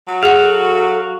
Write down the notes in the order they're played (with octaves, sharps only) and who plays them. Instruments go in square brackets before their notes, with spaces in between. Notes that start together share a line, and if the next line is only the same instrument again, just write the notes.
[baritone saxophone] F#3
[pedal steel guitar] F#4 F5 [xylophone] G#4 F#5
[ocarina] A4